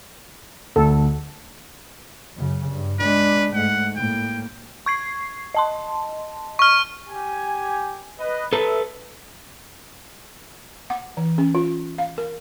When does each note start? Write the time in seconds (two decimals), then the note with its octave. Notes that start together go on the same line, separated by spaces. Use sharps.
0.76 D2 A4
2.37 F#2 C#3
2.70 G2
2.99 G#3 D4 B4
3.54 G#2 A3 F#5
3.96 A2 A#3 G5
4.86 C#6 G#6 C7
5.54 D#5 A5 C6
6.59 C#6 F6
7.08 G4 G#5
8.19 B4 D#5
8.53 A4 B4 E5
10.90 F#5
11.17 E3
11.38 C#4
11.55 F4
11.98 F5
12.18 A#4